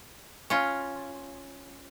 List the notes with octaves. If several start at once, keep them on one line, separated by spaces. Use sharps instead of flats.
C#4 F4